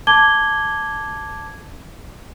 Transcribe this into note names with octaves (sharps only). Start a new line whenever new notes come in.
A5 D6 G#6 G7